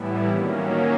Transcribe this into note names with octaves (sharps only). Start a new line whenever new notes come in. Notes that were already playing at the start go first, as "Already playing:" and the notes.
Already playing: A2 E3 G3 B3 E4
D#3 F#3 A#3 C#4